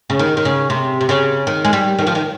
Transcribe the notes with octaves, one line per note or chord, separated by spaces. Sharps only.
C#3
D#3
D#3
C#3
C3
C3
C#3
D#3
G#3
G3
D#3
F3
D#3